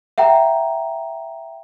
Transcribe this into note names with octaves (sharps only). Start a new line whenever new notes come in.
E5 F#5 G5 A#5